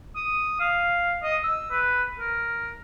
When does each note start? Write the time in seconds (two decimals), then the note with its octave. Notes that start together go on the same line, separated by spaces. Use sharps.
0.16 D#6
0.60 F5
1.23 D#5
1.44 E6
1.71 B4
2.19 A#4